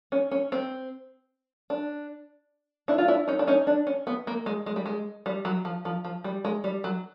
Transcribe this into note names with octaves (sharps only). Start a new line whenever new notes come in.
C#4
C#4
C4
D4
D4 E4
F4
D4 E4
C#4 D#4
D4
C#4 D#4
D4
C#4
B3
A#3
G#3
G#3
G3
G#3
G3
F#3
F3
F3
F3
G3
G#3
G3
F#3